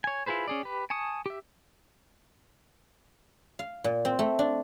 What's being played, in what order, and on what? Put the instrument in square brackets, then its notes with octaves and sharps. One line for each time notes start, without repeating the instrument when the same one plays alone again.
[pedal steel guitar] C#5 G#5
E4 F4 G#4 B4 C5
C#4 G#4 D5
G4 B4
G#5 A5 C#6 D#6
G4 E5
[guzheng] F5
A#2
C4
A3
D4